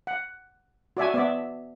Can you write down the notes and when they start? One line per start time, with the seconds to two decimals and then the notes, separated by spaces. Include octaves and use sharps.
0.07 F#5
0.97 F#4 D5 E5 G#5
1.14 B3 D5 E5